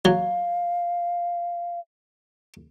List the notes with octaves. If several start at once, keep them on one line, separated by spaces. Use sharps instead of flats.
F#3 F5